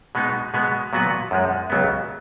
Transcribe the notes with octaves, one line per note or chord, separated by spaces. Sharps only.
B2 G#3 B3 D#4
B2 G#3 B3
A#2 F#3 B3 F#4 B4
F#2 F3 G#3
C#2 C#3 F#3 B3